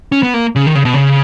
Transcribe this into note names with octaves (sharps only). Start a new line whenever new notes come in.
C#4
B3
A#3
C#3
D#3
C#3
B2
C#3